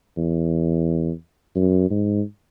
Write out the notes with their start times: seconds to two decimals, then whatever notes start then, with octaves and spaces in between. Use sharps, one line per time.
0.18 E2
1.56 F#2
1.91 G#2